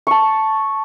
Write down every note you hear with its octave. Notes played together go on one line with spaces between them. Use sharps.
A5 C#6